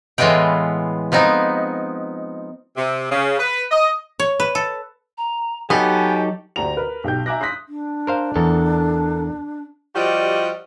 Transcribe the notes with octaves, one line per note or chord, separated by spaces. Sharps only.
A2 E3 G#3 B3 F4 G5
F3 B3 C4 D#4
C3
C#3
B4
D#5
C#5
B4
A4
A#5
F#3 B3 D#4 G4 A4 D#5 G#5
D2 D4 G4 A#5 F7
A#4 B4
B1 G4 G5 G6
E5 G#5 A#5 D6 F#6 A#6
C6 D#6 F#6 A#6 B6
D4
A#4 C5 F5
E2 A4 A#4
F3 G3 F#4 G4 D5 D#5